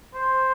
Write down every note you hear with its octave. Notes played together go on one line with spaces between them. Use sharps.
C5